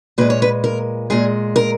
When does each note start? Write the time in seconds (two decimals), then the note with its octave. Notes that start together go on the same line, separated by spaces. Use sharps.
0.18 A#2 G#3 B4
0.30 C#5
0.42 B4
0.64 A#4
1.10 A#2 G#3 G#4
1.56 A#4